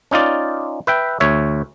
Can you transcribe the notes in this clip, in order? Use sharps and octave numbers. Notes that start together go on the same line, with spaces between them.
C#4 D#4 F4 D5
B4 E5 G5
D2 C#5 E5